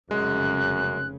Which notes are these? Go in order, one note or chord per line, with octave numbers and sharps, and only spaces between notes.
F1 F#2 C#3 G#3 F#6